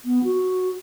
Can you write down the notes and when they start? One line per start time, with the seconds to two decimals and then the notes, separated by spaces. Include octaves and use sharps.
0.05 B3
0.24 F#4